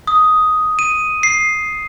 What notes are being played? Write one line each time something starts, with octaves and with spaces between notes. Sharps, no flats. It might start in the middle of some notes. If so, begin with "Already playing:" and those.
D#6
D#7
C7